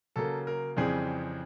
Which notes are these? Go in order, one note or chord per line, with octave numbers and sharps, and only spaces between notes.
C#3 F#3 A#3 A4
A#4
F2 C#3 E3 G3 C4 G#4